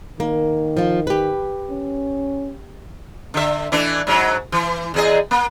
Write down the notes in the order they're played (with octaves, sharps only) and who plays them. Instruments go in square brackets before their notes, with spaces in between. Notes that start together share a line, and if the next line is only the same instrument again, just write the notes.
[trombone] D#3 [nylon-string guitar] A#3
[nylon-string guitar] F3 F4
G4 B4
[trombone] C#4
[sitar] D3 E5
E3 A3 D4
G#2 F#3
E3
E2 G#4 D#5
A#3